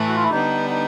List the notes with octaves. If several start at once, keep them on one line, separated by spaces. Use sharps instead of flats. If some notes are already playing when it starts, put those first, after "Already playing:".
Already playing: A2 E3 A3
F#4
F4
E4
D3 G3 B3 D4 D#4
D#4